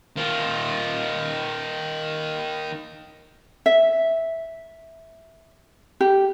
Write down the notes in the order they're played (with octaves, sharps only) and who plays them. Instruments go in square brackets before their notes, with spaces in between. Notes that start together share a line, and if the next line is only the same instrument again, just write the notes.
[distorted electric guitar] D#3 F4
[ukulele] E5
G4